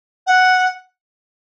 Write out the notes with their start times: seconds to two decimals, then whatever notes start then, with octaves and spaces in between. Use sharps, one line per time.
0.26 F#5